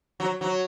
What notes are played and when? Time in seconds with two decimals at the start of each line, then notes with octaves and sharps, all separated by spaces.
0.20 F#3
0.41 F#3